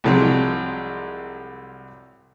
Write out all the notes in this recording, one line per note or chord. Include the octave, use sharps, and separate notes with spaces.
C2 F3 F#3 G#3 C4